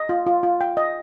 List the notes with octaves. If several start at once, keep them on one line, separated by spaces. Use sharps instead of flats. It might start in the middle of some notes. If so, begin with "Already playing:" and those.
Already playing: D#5
F4
F4
F4
G5
D#5